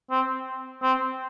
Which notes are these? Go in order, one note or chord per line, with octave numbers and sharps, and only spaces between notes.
C4
C4